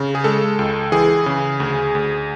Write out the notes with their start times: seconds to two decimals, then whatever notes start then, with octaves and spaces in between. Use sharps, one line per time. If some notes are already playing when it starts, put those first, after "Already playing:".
Already playing: C#3
0.15 G#4
0.24 G#3 A4
0.59 C#2
0.92 E3 G#4
1.26 C#3
1.60 D2
1.95 D2